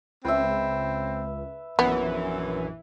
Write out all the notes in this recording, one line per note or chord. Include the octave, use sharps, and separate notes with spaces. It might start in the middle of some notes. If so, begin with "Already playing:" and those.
C#2 C4 B4 E5
A#1 F#2 E3 B3